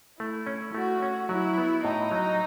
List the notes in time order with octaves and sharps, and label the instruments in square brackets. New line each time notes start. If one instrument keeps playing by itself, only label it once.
[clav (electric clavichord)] A3 [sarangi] E4
[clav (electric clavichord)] C#4
[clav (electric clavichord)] A3 [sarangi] F#4
[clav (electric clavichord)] C#4
[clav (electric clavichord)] F#3 [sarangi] E4
[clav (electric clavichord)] B3
[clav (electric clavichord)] A2 [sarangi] D#4
[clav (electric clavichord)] F#3